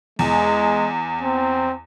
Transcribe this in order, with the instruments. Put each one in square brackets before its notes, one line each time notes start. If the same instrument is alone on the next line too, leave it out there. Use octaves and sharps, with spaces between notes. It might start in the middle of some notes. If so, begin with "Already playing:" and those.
[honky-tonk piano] E2 [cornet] G#3
[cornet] C4